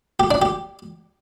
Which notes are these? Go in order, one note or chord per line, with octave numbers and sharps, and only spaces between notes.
G4
D4
G4